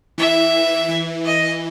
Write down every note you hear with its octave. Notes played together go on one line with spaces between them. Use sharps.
E3 E5
E3
D#5